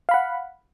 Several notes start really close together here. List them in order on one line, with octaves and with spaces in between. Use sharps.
F5 B5 F#5